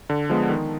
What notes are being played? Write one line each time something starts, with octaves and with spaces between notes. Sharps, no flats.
D3
F3 G#3 B3
D#3